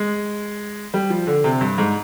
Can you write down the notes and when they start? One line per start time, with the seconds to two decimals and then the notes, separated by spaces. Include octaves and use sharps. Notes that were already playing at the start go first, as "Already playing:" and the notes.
Already playing: G#3
0.94 G3
1.10 F3
1.27 D3
1.44 C3
1.61 G2
1.78 G#2